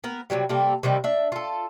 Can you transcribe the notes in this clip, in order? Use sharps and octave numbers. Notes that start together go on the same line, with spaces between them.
B3 A#4
C3 D#3 F#3 G3
C3 G3 A#3 A4
C3 D#3 G3 A#3
D4 E5
F4 A4